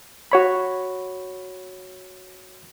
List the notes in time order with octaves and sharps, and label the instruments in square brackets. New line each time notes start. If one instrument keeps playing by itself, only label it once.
[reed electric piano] F#4 C#5 B5